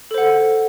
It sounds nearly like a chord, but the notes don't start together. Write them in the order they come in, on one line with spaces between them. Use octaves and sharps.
A4 C5 F#5